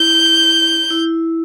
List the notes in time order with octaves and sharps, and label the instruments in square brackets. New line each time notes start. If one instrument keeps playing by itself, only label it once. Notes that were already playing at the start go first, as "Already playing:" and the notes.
Already playing: [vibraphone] E4 [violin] G6
[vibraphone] E4